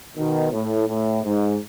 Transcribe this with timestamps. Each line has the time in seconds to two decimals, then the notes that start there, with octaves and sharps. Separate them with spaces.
0.16 B2 D#3
0.52 A2
0.88 A2
1.24 G#2